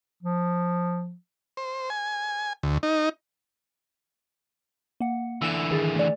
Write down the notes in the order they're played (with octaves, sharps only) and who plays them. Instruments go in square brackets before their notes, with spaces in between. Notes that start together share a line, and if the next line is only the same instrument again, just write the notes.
[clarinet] F3
[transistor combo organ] C5
G#5
D2
D#4
[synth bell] A#3 F#5
[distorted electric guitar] D3 E3 [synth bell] E6 E7
[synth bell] D#3 G#4 A6
A3 D5